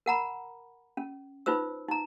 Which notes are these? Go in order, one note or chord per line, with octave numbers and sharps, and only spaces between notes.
A#4 F#5 A#5 B5
C#4
D#4 F4 B4 C5 E6
D#4 A#5